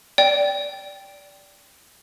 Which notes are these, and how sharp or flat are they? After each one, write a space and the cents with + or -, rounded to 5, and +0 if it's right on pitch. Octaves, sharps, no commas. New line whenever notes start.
D5 -20 G5 +5